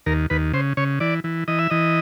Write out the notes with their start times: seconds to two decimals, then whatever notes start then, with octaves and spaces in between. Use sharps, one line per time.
0.06 D#2 A#4
0.30 D#2 B4
0.53 C#3 C5
0.77 C#3 C#5
1.00 E3 D5
1.24 E3
1.48 E3 D#5
1.59 E5
1.70 E3 D#5